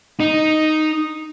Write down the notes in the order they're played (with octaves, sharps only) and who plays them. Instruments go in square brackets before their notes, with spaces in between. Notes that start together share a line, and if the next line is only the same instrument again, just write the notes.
[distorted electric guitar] D#4